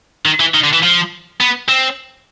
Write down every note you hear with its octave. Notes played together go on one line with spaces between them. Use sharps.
D#3
E3
D#3
D3
E3
F3
B3
C4